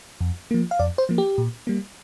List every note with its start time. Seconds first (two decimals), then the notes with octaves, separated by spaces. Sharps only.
0.21 F2
0.51 F3 A#3
0.71 F5
0.79 F2 D5
0.98 C5
1.09 F3 A#3
1.18 G4
1.38 A#2
1.67 G3 A#3